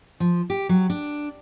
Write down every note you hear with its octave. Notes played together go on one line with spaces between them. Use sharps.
F3
G4
F#3
D4